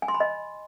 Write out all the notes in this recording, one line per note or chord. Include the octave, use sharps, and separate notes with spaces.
G#5
C6
B5
D#5